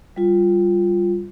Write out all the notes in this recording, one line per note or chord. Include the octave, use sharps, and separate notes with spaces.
G3 F4